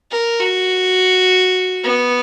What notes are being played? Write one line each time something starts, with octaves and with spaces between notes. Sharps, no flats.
A#4
F#4
B3